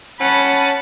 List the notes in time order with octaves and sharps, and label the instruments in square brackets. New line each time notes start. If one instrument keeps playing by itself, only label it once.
[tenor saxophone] C#4 [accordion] F#5 [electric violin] A5 B5